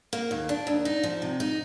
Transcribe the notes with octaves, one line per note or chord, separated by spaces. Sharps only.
A#3
D#2
D4
D#2
D#4
F3
C3
D#4